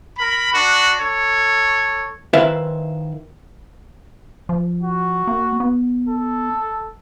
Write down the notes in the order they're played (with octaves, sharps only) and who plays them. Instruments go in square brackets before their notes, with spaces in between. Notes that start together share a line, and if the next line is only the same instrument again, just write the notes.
[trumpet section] A#4 B5
D4 F#4
A4 C#5
[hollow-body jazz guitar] D#3 E4 B4 C5 E5 F5
[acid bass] F3
[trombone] F#4
[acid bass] A#3
B3
[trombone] A4